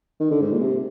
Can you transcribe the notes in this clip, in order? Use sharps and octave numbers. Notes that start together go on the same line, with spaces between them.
D#3
D3
G#2
A#2
C3